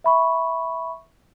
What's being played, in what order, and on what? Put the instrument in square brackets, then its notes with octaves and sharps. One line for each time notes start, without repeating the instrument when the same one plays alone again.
[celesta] E5 B5 C#6